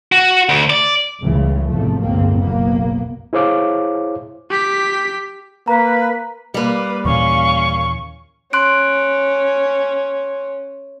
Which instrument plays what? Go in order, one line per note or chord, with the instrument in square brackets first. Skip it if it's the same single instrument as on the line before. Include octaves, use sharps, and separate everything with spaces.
[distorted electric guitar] F#4
D2
D5
[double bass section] C#2 A2 C#3 E3 G3
A1 E2 G#2 C3 F3 A3
G1 C#2 A2 G#3 A#3 C4
F#1 B1 A#3 B3
[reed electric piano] E4 G#4 C5 C#5 F5 D6
[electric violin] G4 B6
[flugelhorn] A#3 [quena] B4 [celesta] A#5
[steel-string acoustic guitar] G3 A#3 [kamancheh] B4
[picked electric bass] D#2 A#2 E3 [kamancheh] C#4 F5 [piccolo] C#6
[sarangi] C#4 [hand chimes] C6 F#6 D7